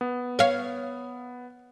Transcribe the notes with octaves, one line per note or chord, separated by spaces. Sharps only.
B3
C#5 F5